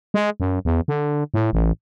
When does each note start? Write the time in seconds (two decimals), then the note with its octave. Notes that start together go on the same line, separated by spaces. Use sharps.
0.14 G#3
0.40 F#2
0.65 E2
0.88 D3
1.34 A2
1.53 A1